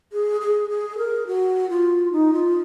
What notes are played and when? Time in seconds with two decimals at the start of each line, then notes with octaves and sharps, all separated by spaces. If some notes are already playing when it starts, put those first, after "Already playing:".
0.13 G#4
0.41 G#4
0.70 G#4
0.98 A#4
1.27 F#4
1.70 F4
2.12 D#4
2.34 F4